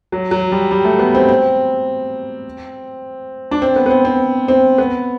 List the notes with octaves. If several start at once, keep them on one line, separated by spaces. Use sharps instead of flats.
F#3
F#3
G3
G3
A3
B3
C4
C4
D4
C4
B3
B3
C4
C4
C4
B3